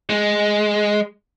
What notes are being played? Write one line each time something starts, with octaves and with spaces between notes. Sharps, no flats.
G#3